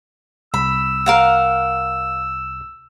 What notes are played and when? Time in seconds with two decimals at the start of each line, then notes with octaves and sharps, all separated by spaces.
0.54 C2 B5 E6
1.06 A#4 F5 F#5